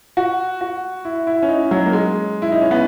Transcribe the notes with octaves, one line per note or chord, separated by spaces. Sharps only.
F#4
F#4
E4
E4
C#4
D#4
F#3
A#3
G#3
E4
D#4
C#4
B3